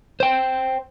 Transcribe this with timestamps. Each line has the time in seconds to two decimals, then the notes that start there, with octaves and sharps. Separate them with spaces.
0.20 C5 G5